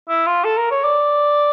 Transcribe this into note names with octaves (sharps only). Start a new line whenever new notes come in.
E4
F4
A4
A#4
C#5
D5